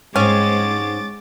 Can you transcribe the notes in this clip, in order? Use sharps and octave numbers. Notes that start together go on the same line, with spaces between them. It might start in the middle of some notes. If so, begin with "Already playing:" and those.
G#2 G#3 C4 C#4 D6 A6